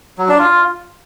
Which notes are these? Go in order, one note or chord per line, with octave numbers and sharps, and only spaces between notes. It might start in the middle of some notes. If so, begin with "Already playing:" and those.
F#3
D4
F4